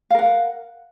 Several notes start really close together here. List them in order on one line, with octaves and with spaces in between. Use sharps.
F5 A#4 F#5